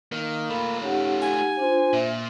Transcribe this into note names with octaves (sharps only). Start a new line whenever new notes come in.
D#3 A#3
A3 F4 B5
C#4 D#4 G4 F#5
G#5
D4 F4 C5
A#2 E5